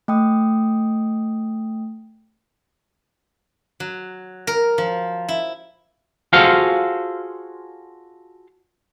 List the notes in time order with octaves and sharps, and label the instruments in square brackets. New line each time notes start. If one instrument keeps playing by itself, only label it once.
[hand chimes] A3 G5 D#6
[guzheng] F#3
A#4
F3
E4
[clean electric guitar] F4 F#4 G#4 A4 C5 F5